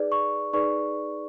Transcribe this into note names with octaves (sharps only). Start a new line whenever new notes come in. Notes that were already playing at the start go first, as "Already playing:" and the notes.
Already playing: D#4 G#4 B4 D5
C#6
D#4 G#4 B4 D5 C#6